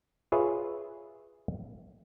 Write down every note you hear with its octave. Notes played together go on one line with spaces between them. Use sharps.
F4 G#4 B4 C#5 E5